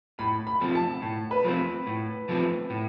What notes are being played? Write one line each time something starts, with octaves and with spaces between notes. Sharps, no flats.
A2 B5
B5
F3 A3 C4
A5
A2
B4
F3 A3 C4
A2
F3 A3 C4
A2